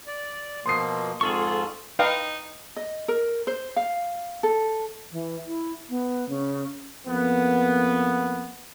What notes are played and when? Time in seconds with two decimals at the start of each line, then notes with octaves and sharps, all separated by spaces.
0.07 D5
0.66 B2 F3 A#3 C6 D#6 C7
1.21 F2 G#2 F4 G#4 A4 C#6
1.99 D#4 B4 F5 G5
2.76 D#5
3.08 A#4
3.47 C5
3.76 F5
4.43 A4
5.12 E3
5.47 E4
5.89 B3
6.29 C#3
7.07 F2 A#3 B3